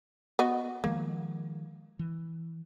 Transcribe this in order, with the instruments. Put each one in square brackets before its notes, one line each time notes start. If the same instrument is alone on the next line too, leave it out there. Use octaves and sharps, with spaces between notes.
[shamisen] B3 F#4 D#5
[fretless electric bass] D#3 F3 G#3 [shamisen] A#3
[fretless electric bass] E3